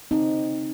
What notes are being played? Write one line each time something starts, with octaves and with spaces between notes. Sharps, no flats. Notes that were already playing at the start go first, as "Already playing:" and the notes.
C#3 C4 D#4